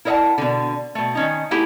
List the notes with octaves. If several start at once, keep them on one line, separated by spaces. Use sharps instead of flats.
E4 A#4 C#5 D#5 F#5 A5
B2 D3
B2 A3
D#3 C#4 D#4
A3 B3 D#4 E4 G4 G#4